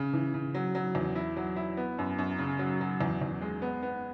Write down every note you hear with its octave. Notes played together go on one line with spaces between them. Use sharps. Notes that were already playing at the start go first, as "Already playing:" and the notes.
Already playing: C#3
E3
C#3
F#3
F#3
E2
E4
F#3
E4
B3
F#2
F#2
C#3
F#3
F#3
E2
E2
G#3
B3
B3